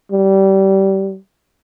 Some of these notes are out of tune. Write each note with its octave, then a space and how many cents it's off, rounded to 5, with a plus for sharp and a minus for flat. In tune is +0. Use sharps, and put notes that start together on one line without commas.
G3 -20